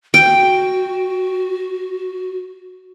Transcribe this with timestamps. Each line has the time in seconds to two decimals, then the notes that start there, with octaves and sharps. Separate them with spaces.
0.14 F#4 G5